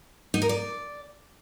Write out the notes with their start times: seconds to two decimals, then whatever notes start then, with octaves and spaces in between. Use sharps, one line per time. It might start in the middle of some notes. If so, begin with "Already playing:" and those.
0.34 D#4
0.42 A#4
0.49 D5